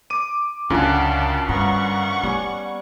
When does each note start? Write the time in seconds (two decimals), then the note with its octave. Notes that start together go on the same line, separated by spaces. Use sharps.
0.10 D6 D#7
0.70 C#2 F#2 D3 C#4 F4 F#5 G5 A5
1.49 G2 B3 F#5 A#5 C#6
2.23 G3 B3 C#4